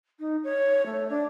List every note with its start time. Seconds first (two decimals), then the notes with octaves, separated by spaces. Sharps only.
0.19 D#4
0.44 C#5
0.86 A3
1.09 D4